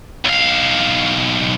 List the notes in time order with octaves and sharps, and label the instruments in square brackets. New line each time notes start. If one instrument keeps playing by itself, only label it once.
[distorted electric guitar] B1 F5